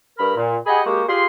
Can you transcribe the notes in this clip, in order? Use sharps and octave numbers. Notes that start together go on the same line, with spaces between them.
G2 A#4 B5
A#2
G4 G#4 D#5 F#5 G#5 B5
G#3 A#3 F#4 G4
F4 G4 G#4 C6